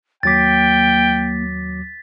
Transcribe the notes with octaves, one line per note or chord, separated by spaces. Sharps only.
D#2 F#3 A#3 G5 D6 A6 B6